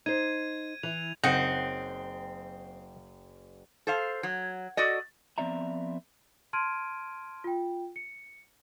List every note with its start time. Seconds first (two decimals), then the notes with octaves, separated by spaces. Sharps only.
0.06 D#4 C5 G#6 D#7
0.83 E3 F7
1.24 F#1 C4 D#4 F#5 C7 E7
3.87 A4 C5 F5
4.23 F#3
4.77 F#4 A4 D5 D#5
5.38 F3 B3 C4 D5 E5 A#5
6.53 A5 C6 F6 G#6 D7 D#7
7.44 F4 G5
7.96 C#7